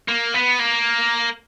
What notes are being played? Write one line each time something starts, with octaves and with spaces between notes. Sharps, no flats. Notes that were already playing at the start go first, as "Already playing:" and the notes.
A#3
B3
A#3